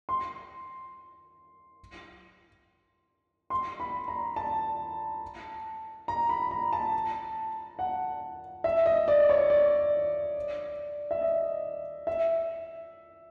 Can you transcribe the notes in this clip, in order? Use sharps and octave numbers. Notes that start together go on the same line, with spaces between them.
C6
C6
B5
A#5
A5
A#5
B5
A#5
A5
F#5
E5
D#5
D5
C#5
D5
E5
D#5
E5